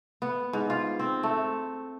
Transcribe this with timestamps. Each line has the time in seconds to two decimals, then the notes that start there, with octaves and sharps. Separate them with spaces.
0.22 B3
0.53 G#2
0.70 F4
0.99 C4
1.23 A3